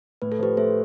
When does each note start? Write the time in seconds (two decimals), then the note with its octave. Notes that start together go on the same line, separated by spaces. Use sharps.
0.22 A2 B4
0.32 A4
0.39 F3 G4 B4
0.57 A3 A4 C5